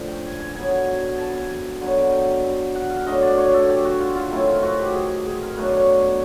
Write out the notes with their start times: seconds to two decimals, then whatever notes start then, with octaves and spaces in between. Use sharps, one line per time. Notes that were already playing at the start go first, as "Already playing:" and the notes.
Already playing: D3 F3 A3 C#4
0.08 G5
0.25 G#5
0.40 G#5
0.55 D3 F#3 B3 G#5
0.71 G#5
1.18 A5
1.34 G#5
1.50 G#5
1.81 D3 F#3 B3
2.12 G5
2.75 F#5
2.90 F5
3.06 D3 F#3 A3 D4 D#5
3.22 D5
3.38 C#5
3.54 A4
3.69 G4
3.85 F#4
4.00 F4
4.16 F4
4.31 D#3 F#3 A3 C4 E4
4.47 F4
4.62 F#4
4.79 G4
4.94 G#4
5.26 G#4
5.42 A#4
5.56 B2 F#3 A3 D4 B4
5.73 C#5